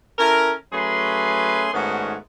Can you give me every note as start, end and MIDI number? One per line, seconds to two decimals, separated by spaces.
0.19 0.53 61
0.19 0.53 64
0.19 0.53 69
0.19 0.53 70
0.73 1.69 54
0.73 1.69 57
0.73 1.69 61
0.73 1.69 68
0.73 1.69 71
0.73 1.69 84
1.73 2.16 44
1.73 2.16 51
1.73 2.16 57
1.73 2.16 59
1.73 2.16 61
1.73 2.16 66